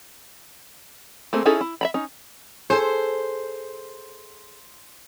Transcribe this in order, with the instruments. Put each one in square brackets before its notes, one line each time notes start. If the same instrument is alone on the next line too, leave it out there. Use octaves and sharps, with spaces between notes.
[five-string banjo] A3 A#3 C4 G#4
C#4 D#4 E4 G#4 A4
E4
E5 A#5 B5
C#4 D#4
[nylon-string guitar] G#4 A4 [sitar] C5